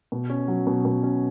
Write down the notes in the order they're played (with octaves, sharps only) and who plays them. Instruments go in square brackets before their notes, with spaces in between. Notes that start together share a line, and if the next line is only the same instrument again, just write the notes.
[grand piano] B2
C#4
F#3
B2
B2
C#4